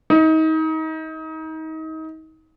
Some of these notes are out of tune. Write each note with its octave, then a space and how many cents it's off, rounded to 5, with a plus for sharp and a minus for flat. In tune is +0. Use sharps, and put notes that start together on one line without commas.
D#4 +30